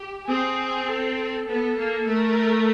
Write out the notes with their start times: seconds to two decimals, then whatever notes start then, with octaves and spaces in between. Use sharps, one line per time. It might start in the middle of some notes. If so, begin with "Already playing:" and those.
Already playing: G4
0.27 C4 G#4
0.88 A4
1.47 B3 A4
1.77 A#3
2.07 A3 A#4